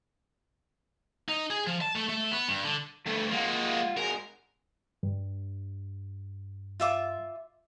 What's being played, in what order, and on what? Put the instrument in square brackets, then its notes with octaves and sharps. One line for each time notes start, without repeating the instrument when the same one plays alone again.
[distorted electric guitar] D#4
G#4
F3
A5
A3
A3
B3
G2
D3
[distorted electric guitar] D2 G2 [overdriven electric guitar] A3
[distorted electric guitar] G#3 A#3 [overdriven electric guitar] F4 F#5
[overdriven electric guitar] G#3 F#4 [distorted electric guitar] A#4
[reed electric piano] G2
[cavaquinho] F4 E5 D6